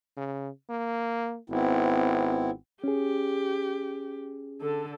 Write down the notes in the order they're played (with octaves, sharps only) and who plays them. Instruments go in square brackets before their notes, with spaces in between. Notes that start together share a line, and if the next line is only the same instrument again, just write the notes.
[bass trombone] C#3
A#3
[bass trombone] G#1 [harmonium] B3 C4 E4
[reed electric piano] C#4 G#4 [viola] G4
[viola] D3 A4